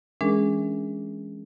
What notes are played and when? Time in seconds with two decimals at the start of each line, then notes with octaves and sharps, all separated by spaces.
0.21 E3 G#3 C#4 D4 G#4 A#4